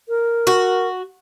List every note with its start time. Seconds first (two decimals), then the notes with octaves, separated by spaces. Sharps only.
0.09 A#4
0.47 F#4